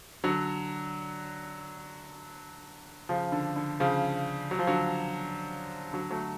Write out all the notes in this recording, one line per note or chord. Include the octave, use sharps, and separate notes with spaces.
D3 F#3
C#3 F3
D3
D3
C#3 F3
F#3
F3
D3 F#3
D3 F#3
F#3 A3